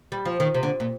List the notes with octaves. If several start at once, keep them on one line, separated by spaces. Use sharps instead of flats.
G3
F3
D#3
C3
D3
A#2